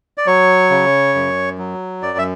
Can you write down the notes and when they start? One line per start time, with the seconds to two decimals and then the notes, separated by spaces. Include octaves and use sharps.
0.18 D5
0.26 F#3 C#5
0.70 C#3
1.15 F#2
1.58 F#3
2.02 F#2 D5
2.18 E5